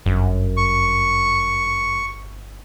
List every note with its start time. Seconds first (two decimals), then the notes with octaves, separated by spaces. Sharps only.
0.06 G1 F#2
0.57 C#6